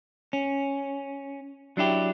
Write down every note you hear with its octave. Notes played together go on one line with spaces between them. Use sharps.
C#4
F#3 D4 E4 G4